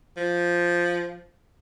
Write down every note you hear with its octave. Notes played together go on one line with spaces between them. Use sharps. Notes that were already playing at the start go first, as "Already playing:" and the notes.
F3